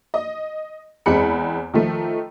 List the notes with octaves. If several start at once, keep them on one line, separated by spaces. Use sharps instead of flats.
D#5
E2 G#3 C4 B5 C#7
D#3 F3 A3